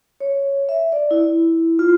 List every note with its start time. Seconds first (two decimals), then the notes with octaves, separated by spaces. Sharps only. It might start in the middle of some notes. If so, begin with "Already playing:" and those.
0.20 C#5
0.69 E5
0.92 D5
1.11 E4
1.79 F4